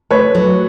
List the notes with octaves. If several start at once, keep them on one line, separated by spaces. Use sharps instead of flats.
A3 B4 C#5
F#3